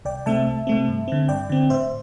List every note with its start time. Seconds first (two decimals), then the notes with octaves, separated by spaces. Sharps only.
0.05 C2 D5 G5
0.26 C3 A3 C4 E5 A5
0.47 C2
0.67 C3 A3 C4
0.88 G2
1.08 D3 C4
1.28 G2 D5 G5
1.49 D3 C4
1.70 A2 C5 E5